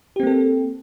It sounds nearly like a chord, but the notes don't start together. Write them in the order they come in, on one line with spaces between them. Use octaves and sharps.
G4 C4 A#3 A4